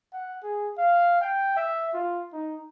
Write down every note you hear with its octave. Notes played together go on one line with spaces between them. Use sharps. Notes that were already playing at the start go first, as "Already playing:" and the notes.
F#5
G#4
F5
G5
E5
F4
D#4